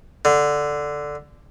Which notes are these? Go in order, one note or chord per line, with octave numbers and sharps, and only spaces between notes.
D3